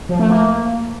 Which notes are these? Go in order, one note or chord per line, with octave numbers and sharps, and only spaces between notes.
F3
A3
A#3